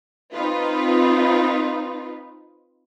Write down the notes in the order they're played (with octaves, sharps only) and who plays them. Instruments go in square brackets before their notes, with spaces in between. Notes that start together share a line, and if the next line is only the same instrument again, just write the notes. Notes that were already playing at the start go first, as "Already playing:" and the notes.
[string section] C4 D#4 F4 B4